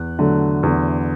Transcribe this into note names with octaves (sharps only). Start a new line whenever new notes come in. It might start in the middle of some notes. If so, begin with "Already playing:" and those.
Already playing: E2 F#6
D3 F#3 A3
E2